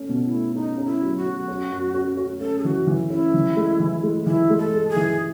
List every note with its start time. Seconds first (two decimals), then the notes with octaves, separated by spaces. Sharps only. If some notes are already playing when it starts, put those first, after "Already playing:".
Already playing: A3 C#4
0.09 B2
0.25 E4
0.32 A3
0.55 C#4 D#4
0.78 C#4
0.86 E4
1.02 F#3
1.17 F#4
1.25 F#3
1.48 C#4
1.72 F#2
1.94 C#4
2.17 C#4
2.41 C#4 A4
2.59 G#4
2.64 E3 F#4
2.87 E3
3.10 C#4 E4
3.34 E3
3.57 G#3
3.80 E3
4.03 G#3
4.26 E3 E4
4.50 G#3
4.58 A4
4.74 G#3
4.89 G#4
4.96 E3